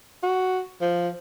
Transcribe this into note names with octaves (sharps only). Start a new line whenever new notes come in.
F#4
F3